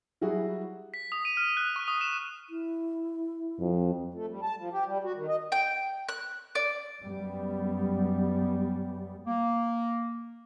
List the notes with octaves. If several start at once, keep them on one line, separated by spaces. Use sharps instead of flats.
F#3 G3 E4 F#4 G#4
B6
D#6
D#7
F6
F#6
C#6
D#6
E7
E4
F2
A3
G3
A5
F3
G4
G3
F#4
D#3
D#5
G5
F#6
D5
F#2 G3 B3
A#3